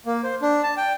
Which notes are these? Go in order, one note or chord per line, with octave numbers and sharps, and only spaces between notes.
A#3
C5
D4
A5
G5